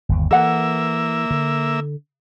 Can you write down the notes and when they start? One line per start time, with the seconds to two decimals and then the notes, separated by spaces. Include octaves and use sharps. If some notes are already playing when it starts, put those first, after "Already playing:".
0.09 G1 D#2
0.31 E3 A#3 A4 E5 F#5
1.31 D3